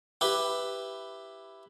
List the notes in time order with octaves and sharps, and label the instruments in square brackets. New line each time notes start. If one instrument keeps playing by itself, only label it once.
[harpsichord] E4 G4 B4